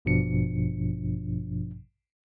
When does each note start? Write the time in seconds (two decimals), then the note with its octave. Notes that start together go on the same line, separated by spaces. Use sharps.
0.05 A1 G2 B2 F3 D4 C#7